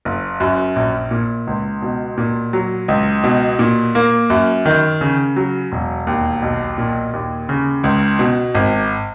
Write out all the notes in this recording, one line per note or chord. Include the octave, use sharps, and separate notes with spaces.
F#1
F#2
A#1
A#2
C#2
B2
A#2
F#3
C#2
B2
A#2
A#3
F#2
D#3
C#3
F#3
E1
D#2
B1
A#2
D#2
C#3
C#2
B2
G#1